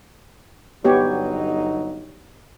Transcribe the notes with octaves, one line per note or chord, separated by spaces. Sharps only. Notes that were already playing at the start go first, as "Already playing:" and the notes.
G1 F#3 B3 D#4 G4 C#5